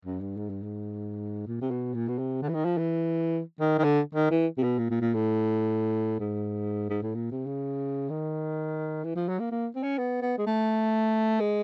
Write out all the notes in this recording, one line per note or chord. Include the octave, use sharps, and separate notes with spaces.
F#2
G2
G#2
G2
G#2
A#2
C3
B2
A#2
B2
C3
D3
E3
D#3
F3
E3
D#3
D#3
D3
D#3
E3
C3
B2
A#2
A#2
A#2
A2
G#2
G#2
A2
A#2
C3
C#3
D#3
E3
F3
F#3
A#3
A#3
C4
C#4
B3
B3
G#3
A3
G#3